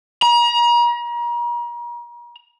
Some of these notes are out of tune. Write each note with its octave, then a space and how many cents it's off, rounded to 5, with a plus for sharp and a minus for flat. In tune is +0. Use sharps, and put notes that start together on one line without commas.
A#5 +40